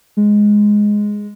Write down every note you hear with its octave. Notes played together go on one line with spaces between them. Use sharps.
G#3